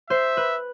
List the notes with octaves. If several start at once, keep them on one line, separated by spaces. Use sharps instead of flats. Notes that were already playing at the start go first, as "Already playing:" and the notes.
C5 E5
B4